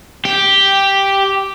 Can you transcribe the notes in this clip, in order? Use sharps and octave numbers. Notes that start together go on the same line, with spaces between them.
G4